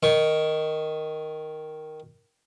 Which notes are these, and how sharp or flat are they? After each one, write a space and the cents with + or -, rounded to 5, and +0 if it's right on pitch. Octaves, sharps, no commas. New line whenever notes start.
D#3 +0 C#6 +0